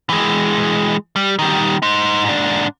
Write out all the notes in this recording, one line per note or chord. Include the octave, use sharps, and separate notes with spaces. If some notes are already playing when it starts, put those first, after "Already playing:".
E3 G#3
G3
D#3 G3
D#4 C5
G#2 D4